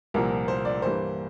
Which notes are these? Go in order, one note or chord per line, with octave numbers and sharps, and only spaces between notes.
C2 A#2 F3 A#4
C5
D5
G2 E3 A#3 C5